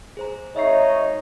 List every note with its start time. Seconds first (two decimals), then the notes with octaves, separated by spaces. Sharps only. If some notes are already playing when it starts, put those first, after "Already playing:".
0.17 G#4 C5 A#5
0.56 G#1 D#4 C#5 D#5 E5 C7